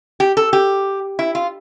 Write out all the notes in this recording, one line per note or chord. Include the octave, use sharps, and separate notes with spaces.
G4
A4
G4
E4
F4